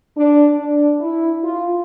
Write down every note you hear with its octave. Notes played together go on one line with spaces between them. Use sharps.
D4
D4
E4
F4